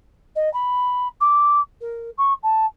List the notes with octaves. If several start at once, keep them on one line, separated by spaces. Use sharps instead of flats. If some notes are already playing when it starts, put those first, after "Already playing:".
D#5
B5
D6
A#4
C#6
A5